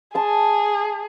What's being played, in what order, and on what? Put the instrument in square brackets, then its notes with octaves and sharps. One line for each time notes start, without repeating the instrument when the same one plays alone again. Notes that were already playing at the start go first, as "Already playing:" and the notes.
[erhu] G#4 [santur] A5 C6